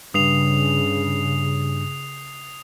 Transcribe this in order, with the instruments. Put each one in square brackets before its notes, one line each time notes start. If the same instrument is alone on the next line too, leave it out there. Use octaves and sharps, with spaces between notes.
[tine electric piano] G2 [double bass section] C#3 [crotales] D#6 C7 F7